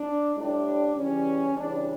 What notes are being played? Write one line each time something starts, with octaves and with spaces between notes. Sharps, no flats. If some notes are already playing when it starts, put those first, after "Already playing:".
Already playing: D4
A2 G3 D4
C#3 E3 G3 C#4
C#3 E3 G3 D4